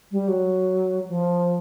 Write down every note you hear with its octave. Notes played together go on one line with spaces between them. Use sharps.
G3
F#3
F3